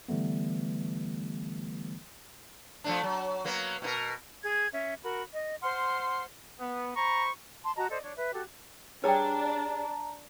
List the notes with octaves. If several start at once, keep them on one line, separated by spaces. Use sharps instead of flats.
D3 E3 G3 A3 B3
F3 A3 D4
F#3
F#3 A#3 B3
B2 E4 A#4
G#4 G#6
C#4 E5
F#4 A#4 B5
D#5
C5 F#5 C6 F6
B3
C5 A#5 B5 C#6
A5 C6
F#4 D#5 A5 A#5
A4 C5 D5 D#5
D4 C#5
B4 E5
F#4 G4 A4
G3 D4 G#4 B4 C#5 G5 A5 A#5